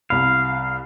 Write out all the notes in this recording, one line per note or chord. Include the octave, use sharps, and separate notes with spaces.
C2 F5 B5